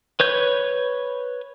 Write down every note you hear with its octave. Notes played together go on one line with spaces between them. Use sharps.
B4 C#5 G6